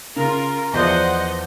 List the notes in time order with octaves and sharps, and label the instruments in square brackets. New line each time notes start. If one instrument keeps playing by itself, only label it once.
[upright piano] C#3 [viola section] F4 A#4
[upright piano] E2 F3 D5 [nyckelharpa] C5 [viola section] D#5 F#5